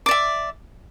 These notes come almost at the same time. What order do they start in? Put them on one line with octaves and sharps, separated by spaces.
D6 D5 E5